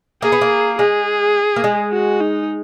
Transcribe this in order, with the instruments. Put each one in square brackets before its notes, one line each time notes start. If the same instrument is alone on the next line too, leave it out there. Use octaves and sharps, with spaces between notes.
[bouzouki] A#3 [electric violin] G#4
[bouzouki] B3
A#3
[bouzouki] G#3 [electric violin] G#4
[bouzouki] A#3
G#3
[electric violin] F#4
D#4